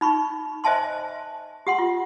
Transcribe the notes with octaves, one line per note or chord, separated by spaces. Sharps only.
D#4 B5 C#6
C5 D#5 E5 G#5 A5 C6
G4 F#5 C6
F4